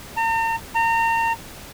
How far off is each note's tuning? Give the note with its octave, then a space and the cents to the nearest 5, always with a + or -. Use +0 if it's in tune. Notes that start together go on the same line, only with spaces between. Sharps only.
A#5 -45
A#5 -35